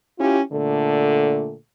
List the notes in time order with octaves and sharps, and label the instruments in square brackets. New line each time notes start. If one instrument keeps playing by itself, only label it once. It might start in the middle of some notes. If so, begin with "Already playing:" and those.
[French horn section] C#4 E4 F4 G4
A#2 D3 A3 A4